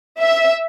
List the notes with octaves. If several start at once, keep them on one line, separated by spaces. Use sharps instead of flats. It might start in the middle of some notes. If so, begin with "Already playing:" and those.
E5